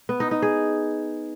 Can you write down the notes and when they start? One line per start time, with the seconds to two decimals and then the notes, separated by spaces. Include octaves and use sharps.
0.09 B3
0.20 D#4
0.31 D#4
0.42 G#4